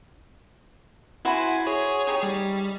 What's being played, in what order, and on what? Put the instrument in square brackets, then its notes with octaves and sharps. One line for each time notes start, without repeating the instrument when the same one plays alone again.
[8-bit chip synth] E4 G#5 [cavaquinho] F#4 C5 B5
[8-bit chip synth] G#4 C#5
[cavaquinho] D#4 G4
[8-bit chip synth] G3